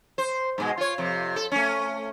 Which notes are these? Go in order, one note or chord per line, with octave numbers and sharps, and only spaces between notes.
C5
G#2 B2 G#3
F4 C#5
F2 C3
A4
A3 C#4